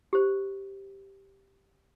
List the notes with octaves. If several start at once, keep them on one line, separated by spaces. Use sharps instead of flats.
G4 C5